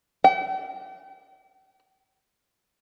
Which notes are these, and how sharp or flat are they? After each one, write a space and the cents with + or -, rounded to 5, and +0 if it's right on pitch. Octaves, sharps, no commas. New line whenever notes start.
G5 -45